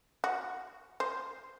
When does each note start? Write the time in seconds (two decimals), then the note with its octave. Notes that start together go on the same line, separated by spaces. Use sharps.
0.24 F#4
1.00 C5